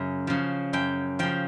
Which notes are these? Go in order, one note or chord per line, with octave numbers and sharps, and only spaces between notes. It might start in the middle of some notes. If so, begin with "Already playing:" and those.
Already playing: F#2 C#3
C#3 F3
F#2 G5
C#3 F3 G5